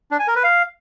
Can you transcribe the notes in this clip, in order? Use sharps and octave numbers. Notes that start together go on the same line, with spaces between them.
D4
G#5
A#4
B4
F5